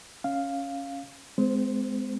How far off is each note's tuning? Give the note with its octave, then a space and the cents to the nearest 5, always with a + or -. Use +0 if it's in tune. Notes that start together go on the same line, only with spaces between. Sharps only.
C#4 +0 F5 +0
G#3 +10 C4 -40 C5 +0